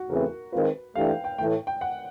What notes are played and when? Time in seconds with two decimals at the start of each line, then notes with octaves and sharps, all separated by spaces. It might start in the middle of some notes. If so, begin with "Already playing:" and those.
Already playing: F#4
0.09 E2 C#3 E3 A3 C4 A#4
0.52 D#3 G#3 C4 F4 A#4 B4
0.95 E3 A3 D4 G4 F5
1.10 G5
1.24 G5
1.38 A2 E3 A3 G5
1.67 G5
1.81 F#5